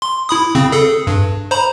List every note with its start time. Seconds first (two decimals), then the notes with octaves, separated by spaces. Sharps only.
0.02 C6
0.29 E4 B5 D#6
0.55 C#3 C4
0.72 G#4 A4
1.07 G2
1.51 C5 A#5 B5